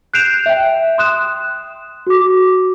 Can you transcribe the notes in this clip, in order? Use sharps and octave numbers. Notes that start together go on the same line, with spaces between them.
F#6 G6 C7 D7 E7 F7
E5 G5
C6 D#6 F#6 E7
F#4 D6